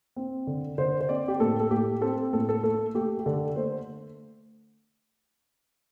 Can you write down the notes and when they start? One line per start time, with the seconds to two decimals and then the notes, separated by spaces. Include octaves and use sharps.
0.16 C4
0.47 D3
0.78 D3 C5
1.01 C5
1.09 C4 D5
1.28 G4
1.40 A2 A4
1.60 A4
1.70 A2 G4
2.02 C4 A4
2.33 A2 A4
2.49 A4
2.64 A3 A4
2.94 A3 G4
3.19 G4
3.26 D3 A4
3.56 A3 C5